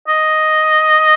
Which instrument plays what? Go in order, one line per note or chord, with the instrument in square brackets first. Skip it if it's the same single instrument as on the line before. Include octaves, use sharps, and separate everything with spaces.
[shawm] D#5